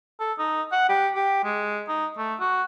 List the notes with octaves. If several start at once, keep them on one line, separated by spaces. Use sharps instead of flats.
A4
D#4
F#5
G4
G4
G#3
D#4
A3
F#4